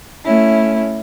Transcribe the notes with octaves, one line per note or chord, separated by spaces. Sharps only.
A3 C#4 E4